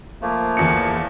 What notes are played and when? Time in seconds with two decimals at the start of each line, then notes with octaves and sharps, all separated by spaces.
0.22 F3 A3 A#3
0.57 E2 C#7